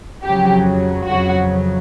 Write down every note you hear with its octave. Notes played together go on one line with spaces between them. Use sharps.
F2 C#3 F#3 G4
F2 C#3 F#3 F#4